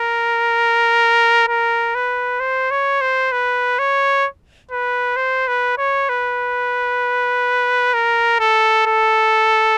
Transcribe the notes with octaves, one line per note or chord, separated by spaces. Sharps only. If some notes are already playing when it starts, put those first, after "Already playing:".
Already playing: A#4
A#4
B4
C5
C#5
C5
B4
C#5
B4
C5
B4
C#5
B4
A#4
A4
A4